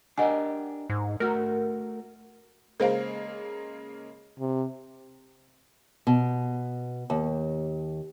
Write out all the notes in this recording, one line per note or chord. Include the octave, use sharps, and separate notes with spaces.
D4 G4 A#4 D#5 F#5 G#5
G#2
A3 F#4 A#4
C#3 G#3 A#3 A#4 C5 F5
C3
B2
D#2